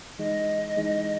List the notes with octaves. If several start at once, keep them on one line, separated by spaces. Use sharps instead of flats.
E3 G#3 D#4 G#4 D#5
E3 G#3 D#4 G#4